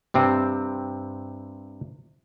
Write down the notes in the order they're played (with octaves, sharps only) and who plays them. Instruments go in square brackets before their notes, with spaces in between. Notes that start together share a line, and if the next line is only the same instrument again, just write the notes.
[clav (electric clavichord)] G2 C3 C4